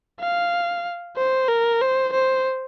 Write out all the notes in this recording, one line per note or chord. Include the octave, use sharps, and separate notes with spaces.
F5
C5
A#4
C5
C5